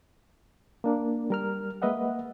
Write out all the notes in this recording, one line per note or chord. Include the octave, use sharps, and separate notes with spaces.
A#3 D4 A#4
G3 A#4 F6
G#3 A#3 B4 D#5 E5 F#5